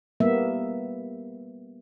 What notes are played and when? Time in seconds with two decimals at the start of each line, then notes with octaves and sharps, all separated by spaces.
0.20 G3 A#3 B3 E5